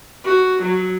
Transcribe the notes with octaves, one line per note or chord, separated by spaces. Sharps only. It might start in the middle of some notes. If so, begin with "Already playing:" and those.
F#4
F#3